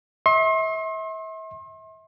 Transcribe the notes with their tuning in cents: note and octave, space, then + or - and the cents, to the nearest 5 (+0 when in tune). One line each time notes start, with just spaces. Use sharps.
E5 -35 C6 +40